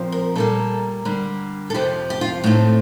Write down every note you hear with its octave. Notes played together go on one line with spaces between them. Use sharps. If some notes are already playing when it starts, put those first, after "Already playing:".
Already playing: A#2 F3 C4
A#4
A#2 G3 A#3 A4
D3 G3 A#3
A4
F2 C3 F3 G4
G4
F4
A2 A3 C4 D#4